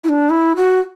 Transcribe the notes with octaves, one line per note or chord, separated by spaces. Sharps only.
E4
D4
E4
F#4